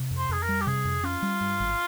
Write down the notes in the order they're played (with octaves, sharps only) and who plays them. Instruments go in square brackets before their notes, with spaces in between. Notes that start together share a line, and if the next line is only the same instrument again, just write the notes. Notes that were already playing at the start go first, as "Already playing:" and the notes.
Already playing: [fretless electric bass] C3
F2
[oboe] C5
[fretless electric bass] F2 [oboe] G#4
[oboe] A#4
[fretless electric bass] G3
[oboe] G4
[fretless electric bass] C3 [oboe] G#4
[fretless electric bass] F2
[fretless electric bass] C#4 [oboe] F4
[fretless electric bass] G3
G2
G#1